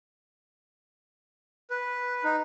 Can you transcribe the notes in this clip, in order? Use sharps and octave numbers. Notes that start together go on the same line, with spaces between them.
B4
D#4